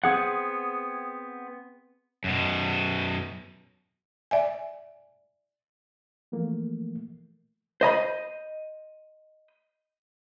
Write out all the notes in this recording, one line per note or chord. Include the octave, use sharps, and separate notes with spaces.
B3 C4 G#4 F#5
F#2 B2
D5 E5 G#5
E3 F3 A3 A#3
C5 D#5 A#5 B5